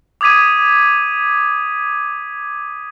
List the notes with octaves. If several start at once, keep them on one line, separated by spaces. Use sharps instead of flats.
D6 D#6 G#6 B6 D#7